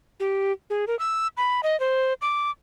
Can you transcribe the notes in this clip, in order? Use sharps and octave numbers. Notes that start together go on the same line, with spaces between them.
G4
G#4
A#4
E6
B5
D#5
C5
D6